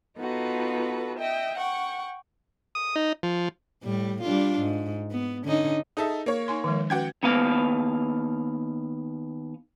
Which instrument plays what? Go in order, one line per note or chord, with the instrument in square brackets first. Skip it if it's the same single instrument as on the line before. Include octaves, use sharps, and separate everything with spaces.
[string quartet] B3 D#4 F4 F#4 A4 B4
D#5 E5 G5
F#5 G5 C#6
[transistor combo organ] D#6
D#4
F3
[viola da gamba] A2 G3
G3 D4 F4
G#2
B3
D3 C#4 D#4
[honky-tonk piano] D#4 A4 E5 [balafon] G#4
[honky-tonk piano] A#3 C#5
[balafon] D#4 G#5 C6
D#3 F3 G#3
[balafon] C#4 F#4 B4 [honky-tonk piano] F#5 G5 G#6
[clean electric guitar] D#2 B3 B4 F5